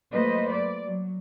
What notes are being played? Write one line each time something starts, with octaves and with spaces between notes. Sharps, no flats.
F#3 A3 A#3 B4 C5 D#5
D5
F#3